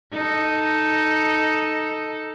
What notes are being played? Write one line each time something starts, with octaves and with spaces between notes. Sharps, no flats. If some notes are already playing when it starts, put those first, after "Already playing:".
D#4 A4